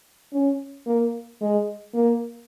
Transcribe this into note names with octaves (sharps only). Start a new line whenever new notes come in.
C#4
A#3
G#3
A#3